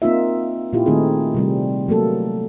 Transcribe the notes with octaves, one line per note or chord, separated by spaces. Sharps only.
A#3 C4 D#4 F4 E5
A#2 E4 F4 G4
D#3 A3 C4 D#4 G#4
C3 G3 C4
F#3 A3 A#3 A4